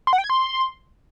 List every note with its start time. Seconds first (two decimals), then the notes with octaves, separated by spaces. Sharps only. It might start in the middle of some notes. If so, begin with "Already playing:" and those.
0.07 C6
0.13 F#5
0.18 G5
0.24 G#6
0.30 C6